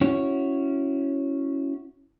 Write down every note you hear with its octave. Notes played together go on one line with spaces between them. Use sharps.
C#4 E4 F#4 C#5